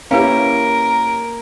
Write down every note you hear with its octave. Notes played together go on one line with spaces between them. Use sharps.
A#3 C#4 E4 G4 A#4 B4 F5